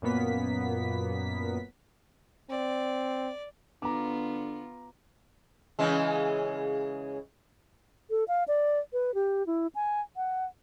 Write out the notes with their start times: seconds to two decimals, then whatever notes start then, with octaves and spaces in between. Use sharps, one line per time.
0.02 F#2 A#2 A#3 B3 B6
2.50 C4 D5
3.82 D3 B3 F4 A#5 D6
5.79 C#3 E3 G#3
8.10 A4
8.28 F5
8.48 D5
8.93 B4
9.14 G4
9.47 E4
9.75 G#5
10.17 F#5